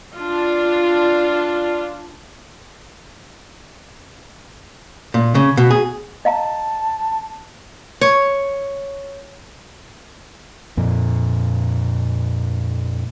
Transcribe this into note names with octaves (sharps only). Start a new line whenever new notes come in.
D4 F4
A#2
C#3
B2
G#4
D#5 F5 A5 A#5
C#5
F2 A#2